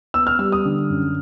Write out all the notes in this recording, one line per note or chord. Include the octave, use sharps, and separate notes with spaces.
B3 E6
F6
G3 E6
D#6
D3
F#2